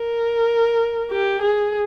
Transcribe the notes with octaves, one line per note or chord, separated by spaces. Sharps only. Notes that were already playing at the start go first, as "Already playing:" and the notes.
Already playing: A#4
G4
G#4